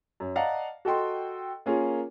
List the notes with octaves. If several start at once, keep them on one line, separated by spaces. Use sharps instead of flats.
F#2
D5 D#5 F5 F#5 A5 A#5
F#4 A4 D#5 G5 C6
A#3 C#4 F4 G#4 A#4